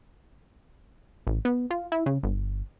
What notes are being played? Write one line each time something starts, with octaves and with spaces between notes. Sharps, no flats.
A1
B3
F4
E4
C#3
G1